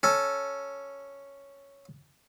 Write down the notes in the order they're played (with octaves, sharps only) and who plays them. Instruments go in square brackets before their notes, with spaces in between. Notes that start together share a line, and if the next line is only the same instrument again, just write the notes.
[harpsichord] C#4 A4